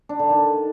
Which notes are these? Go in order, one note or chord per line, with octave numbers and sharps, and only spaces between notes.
D4
D3
D#3